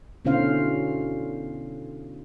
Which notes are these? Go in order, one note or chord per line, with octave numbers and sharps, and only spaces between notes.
B2 D3 C#4 E4 C5 F5